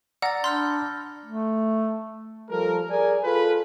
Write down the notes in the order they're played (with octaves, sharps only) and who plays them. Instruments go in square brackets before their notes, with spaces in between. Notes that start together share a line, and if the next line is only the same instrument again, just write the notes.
[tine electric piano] D5 A#5 A#6 [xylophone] F#5 [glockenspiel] E6 A6
[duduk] D4 [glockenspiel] B5 F6 G6 [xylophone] C6
[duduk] A3
[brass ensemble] F3 G3 A4 A#4
G#4 A#4 D5 G#5
F4 G#4 A4 B4